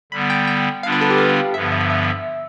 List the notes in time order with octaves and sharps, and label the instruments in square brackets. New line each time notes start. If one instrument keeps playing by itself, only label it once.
[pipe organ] D3 G3 B3 [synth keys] B5
[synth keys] G5
G5
[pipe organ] D3 G3 B3 D4 F4 [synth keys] F5
[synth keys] B4
A4
G4
F5
[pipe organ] G2 D3 F3 B3 [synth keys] E5
[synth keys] E5
E5